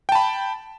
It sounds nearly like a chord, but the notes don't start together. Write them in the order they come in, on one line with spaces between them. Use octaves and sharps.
G5 A5 B5